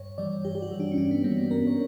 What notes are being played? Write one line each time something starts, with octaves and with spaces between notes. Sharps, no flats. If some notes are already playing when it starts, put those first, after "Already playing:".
Already playing: G2 C#5
E3 G3 D5
G2 G4
G4
F#4
E3 G3
D4
C#4
G2 D4
B3
E3 G3 A#3
B3
G2 A#4
C#5